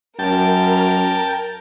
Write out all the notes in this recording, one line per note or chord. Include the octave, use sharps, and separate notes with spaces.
F#2 A#4 G5 A5